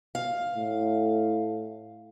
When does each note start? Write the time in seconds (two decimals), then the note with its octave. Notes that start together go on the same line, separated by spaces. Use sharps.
0.15 F5
0.56 A2